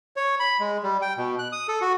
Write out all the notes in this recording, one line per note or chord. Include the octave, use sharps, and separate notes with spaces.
C#5
B5
G#3
G3
G5
B2
F#6
D#6
A4
F#4